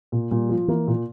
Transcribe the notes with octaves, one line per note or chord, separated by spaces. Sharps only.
A#2
A#2 G3
F3
E3 A#3
A#2